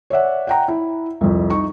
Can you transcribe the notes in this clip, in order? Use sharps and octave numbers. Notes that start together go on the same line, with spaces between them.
C#5 D5 E5 F#5
F#5 G5 A#5
E4
C2 F2
D#4 C#6